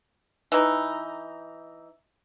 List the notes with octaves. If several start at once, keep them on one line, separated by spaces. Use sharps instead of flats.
E3 D#4